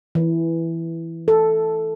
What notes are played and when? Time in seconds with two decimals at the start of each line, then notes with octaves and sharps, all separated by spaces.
0.15 E3
1.28 A4